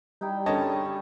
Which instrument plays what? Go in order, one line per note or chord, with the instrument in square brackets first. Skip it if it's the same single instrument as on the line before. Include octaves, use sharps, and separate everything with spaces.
[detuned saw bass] G3 [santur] D#4 E4 G5
[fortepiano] G2 D3 C#4 [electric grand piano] C#5 D#5 A5
[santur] G#3 C#6